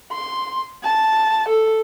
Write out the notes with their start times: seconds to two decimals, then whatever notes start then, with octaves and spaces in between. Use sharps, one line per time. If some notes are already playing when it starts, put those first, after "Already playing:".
0.12 C6
0.84 A5
1.49 A4